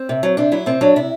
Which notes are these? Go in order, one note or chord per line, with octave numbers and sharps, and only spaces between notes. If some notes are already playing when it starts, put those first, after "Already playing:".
Already playing: C4
C3
F#3
C3 D4
F#3 E4
C3 C4
F#3 D4
C3 E4